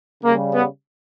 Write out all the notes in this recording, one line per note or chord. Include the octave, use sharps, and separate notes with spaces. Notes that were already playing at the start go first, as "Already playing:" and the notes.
C#3 G3 A#3
B3